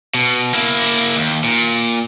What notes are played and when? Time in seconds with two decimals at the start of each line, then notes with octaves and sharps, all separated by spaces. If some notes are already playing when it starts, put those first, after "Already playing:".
0.14 B2
0.54 A#3 E4
1.17 D#2
1.44 A#2